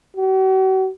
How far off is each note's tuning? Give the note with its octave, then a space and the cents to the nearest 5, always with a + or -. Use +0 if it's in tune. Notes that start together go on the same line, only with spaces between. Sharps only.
F#4 +45